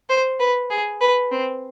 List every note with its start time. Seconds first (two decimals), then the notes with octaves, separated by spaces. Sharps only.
0.09 C5
0.40 B4
0.70 G#4
1.01 B4
1.32 C4